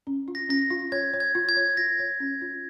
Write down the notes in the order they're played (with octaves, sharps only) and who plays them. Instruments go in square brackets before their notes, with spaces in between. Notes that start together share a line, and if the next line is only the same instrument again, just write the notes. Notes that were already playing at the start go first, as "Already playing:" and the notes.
[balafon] C#4
F4
[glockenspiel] A#6
[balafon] C#4 [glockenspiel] A#6
[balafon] F4
[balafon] C#5 [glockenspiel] G#6
[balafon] C#5
[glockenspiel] G#6
[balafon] F4
[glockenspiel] G#6
[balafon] C#5
[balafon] F4 [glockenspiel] A#6
[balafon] C#5
C#4
F4